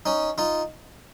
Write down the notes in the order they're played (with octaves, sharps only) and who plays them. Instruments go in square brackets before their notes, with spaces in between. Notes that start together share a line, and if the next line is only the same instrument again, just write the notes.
[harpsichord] C#4 D#4
D#4 F4